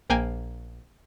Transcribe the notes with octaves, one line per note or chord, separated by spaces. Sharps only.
A#1 A#3 G5 G#5